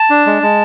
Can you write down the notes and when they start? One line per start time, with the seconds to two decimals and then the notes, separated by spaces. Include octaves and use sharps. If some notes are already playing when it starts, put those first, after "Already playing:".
Already playing: A5
0.10 D4
0.26 G#3
0.42 G#3